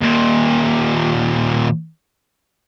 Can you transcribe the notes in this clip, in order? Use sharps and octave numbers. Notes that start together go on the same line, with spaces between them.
D#2 A#2